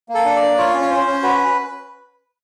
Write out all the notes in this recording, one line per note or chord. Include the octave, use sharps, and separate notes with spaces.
A#3
A4
D4
D5
A#3
F4 C#5
C#4
C#5
C#4 C5
C#4
F#4 B4